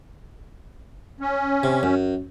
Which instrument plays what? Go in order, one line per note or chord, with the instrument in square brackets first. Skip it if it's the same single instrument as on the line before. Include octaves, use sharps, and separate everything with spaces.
[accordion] C#4
[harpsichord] C3
F#2